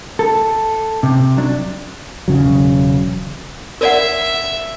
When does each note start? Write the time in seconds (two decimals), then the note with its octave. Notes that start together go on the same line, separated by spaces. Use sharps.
0.19 A4
1.03 C3
1.37 F#3 D4
2.28 E1 C#3 F#3
3.81 A#4 D5 E5 F#5